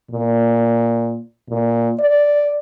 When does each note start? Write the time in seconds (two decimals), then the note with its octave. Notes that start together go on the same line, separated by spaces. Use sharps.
0.11 A#2
1.49 A#2
2.00 D5